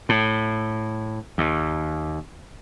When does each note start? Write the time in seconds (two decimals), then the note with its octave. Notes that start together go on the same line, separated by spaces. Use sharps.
0.09 A2
1.38 D#2